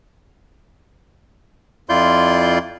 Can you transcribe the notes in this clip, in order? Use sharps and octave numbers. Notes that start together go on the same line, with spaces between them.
F2 E4 F4 D5 C6 G6